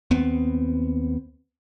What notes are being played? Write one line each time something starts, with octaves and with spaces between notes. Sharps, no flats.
D#2 B3 C4